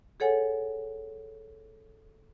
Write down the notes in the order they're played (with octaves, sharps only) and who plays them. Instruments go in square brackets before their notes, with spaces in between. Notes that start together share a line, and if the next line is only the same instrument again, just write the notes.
[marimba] G#4 A4 C#5 F#5 G#5